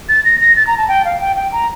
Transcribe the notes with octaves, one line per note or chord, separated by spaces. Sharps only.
A6
A#6
A#6
A6
A#5
A5
G5
F5
G5
G5
A#5